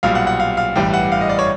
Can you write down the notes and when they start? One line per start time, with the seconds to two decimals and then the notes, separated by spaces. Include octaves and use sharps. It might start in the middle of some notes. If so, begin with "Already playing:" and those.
0.03 B1 A#2 G3 F5
0.15 F#5
0.27 F#5
0.40 F5
0.57 F5
0.76 A1 G2 E3 G3 G5
0.94 F#5
1.12 F5
1.21 D#5
1.29 D5
1.39 C#5